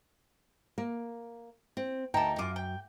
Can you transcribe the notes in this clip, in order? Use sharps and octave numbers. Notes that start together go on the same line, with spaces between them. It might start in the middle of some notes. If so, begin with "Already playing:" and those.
A#3
C4
D2 D#4 A#4 G5 A5
F#2 F4 D6
G5